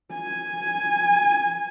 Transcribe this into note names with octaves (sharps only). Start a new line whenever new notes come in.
G#5